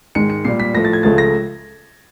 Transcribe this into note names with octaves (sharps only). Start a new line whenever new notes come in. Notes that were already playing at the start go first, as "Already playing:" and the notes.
G#2 D#3 G#3 C#7
C#7
A#2 G3 C7
B6
A2 F3 A3 A#6
A6
G#6
C#2 C#3 F3 A3 A6
A#6